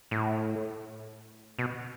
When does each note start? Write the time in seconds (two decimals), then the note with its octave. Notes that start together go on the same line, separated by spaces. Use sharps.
0.11 A2
1.59 B2